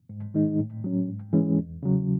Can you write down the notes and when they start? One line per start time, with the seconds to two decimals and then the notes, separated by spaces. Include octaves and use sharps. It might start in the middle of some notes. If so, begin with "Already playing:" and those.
0.09 G#2
0.34 D#3 G#3 D#4
0.59 A2
0.84 F#3 C#4
1.09 G#2
1.33 E3 G#3 C#4
1.59 E2
1.83 C#3 F#3